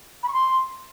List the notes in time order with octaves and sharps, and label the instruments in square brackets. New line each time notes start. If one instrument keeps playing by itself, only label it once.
[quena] B5
C#6
C6